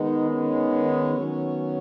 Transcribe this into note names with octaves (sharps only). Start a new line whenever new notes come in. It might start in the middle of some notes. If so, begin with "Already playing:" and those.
Already playing: D#3 G#3 B3 D#4
C#4
D#3 F#3 B3